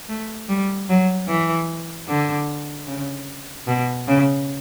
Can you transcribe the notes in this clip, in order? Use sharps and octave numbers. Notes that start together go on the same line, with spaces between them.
A3
G3
F#3
E3
D3
C#3
B2
C#3